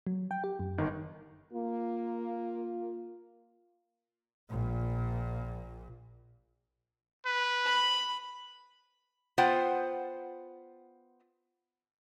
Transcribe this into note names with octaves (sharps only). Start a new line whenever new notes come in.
F#3
G5
G4
F#2
G1 D#3 D#4
A#3 F4
A#1 A#2
B4
B5
B3 F4 C5 F#5 G5